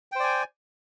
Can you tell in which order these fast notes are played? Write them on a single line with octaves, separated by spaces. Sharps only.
G5 C5 D5 G#5